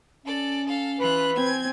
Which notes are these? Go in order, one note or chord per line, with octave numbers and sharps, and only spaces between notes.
C#4 A4 D5
A4 F5
E3 F4 B4 F#6
C4 G#5 G#6